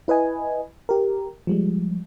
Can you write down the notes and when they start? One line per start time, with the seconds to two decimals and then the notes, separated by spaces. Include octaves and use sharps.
0.08 E4 B4 D#5 G#5
0.89 G4 A#4
1.47 F3 G3 G#3